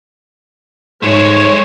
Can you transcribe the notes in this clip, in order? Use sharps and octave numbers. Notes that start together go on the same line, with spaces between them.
G#2 G#3 A3 C#5